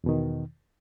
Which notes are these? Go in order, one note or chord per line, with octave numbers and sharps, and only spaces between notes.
E2 B2 D#3